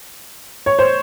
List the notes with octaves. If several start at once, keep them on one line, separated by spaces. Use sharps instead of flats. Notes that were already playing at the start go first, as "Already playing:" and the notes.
C#5
C5